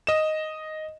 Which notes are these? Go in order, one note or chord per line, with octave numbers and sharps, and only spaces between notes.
D#5 E7